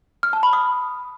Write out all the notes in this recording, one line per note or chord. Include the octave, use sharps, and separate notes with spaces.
F6
A5
B5
D#6